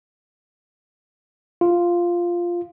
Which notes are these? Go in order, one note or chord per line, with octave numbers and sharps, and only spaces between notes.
F4